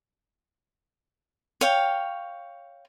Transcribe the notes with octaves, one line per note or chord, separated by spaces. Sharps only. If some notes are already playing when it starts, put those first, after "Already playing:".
C#5 F5 G5